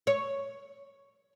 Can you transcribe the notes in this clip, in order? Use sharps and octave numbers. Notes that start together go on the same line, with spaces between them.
C#5